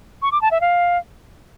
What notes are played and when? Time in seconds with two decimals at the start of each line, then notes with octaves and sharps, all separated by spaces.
0.22 C#6
0.32 D6
0.42 A5
0.51 E5
0.61 F5